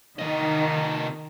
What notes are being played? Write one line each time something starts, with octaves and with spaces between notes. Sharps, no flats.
C3 D#3 D#5